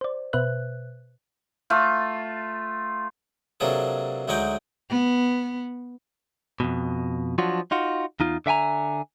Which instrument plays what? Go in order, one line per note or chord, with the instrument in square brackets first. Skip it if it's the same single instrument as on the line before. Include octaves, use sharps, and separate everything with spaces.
[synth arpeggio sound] C5 D5
B2 B4 C5 E5 F#6
[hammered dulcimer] A3 F4
[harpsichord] C3 F#3 A#3 D4 G#4 A4
D2 F#3 G#3 D#4 F#5 G5
[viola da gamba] B3
[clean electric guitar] F2 G#2 B2
F3 F#3 D4 F4 F#4
D#4 F4 F#4
E2 D#4 F4
D3 E5 G5 G#5 A#5